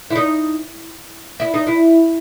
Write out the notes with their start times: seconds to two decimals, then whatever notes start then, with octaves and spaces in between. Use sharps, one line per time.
0.10 E4
0.15 D#4
1.40 E4
1.54 D#4
1.67 E4